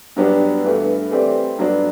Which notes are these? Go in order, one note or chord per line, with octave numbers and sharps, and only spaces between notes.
G2 F#3 B3 D4 G4
G2 E3 A3
E3 A3 C4 G4 D5
G2 F#3 B3 D4